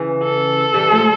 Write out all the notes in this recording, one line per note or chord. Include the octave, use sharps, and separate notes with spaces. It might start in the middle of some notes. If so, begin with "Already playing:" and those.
Already playing: C#3 E3
A4
E3 G3
F3 A3